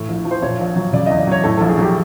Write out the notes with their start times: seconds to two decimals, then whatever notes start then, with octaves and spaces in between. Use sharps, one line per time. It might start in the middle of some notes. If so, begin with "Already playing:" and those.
Already playing: A2 E3
0.09 A#1
0.25 F3
0.31 C5
0.42 A#2 C#5
0.60 A#1
0.76 F#3
0.93 C#3 D5
1.06 E2 D#5
1.18 D5
1.27 F#3 C#5
1.44 A2 A4
1.57 A#1 A4
1.69 G#4
1.78 F#3 G4